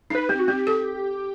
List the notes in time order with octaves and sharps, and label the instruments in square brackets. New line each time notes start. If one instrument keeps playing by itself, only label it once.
[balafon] D#4 [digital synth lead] B4
[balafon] C4 [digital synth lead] G4
[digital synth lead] F#4
[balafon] C4 [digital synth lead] G4
[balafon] A4